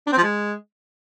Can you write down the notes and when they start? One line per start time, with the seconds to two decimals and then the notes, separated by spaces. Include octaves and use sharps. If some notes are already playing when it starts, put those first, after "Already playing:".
0.07 D4
0.12 C4
0.18 F3
0.23 G#3